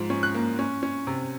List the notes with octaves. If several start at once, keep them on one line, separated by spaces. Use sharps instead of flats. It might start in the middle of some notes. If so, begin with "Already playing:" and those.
Already playing: G#2 F3
C#4
F#6
A#3
C#4
C#4
C3